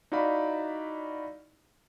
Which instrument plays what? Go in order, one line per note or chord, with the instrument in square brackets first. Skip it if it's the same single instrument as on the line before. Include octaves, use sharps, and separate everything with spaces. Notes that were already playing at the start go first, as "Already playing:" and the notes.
[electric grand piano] D#4 E4 F#4 D5 F5 B5